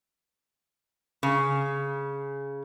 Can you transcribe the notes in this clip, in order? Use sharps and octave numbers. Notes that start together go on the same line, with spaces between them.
C#3